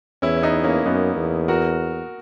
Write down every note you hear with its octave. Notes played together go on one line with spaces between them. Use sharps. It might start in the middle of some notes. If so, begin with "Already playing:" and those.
E2 C#4 E4
B3 D#4
A#3 C#4
F#2 B3 D#4
E2
F#4 A#4